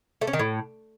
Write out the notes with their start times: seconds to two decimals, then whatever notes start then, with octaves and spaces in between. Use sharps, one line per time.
0.21 A3
0.27 C#4
0.33 D#3
0.39 A2